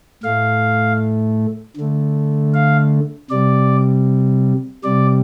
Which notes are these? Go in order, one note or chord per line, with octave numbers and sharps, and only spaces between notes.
A2 A3 F5
D3 A3
F5
C3 G3 D5
C3 G3 D5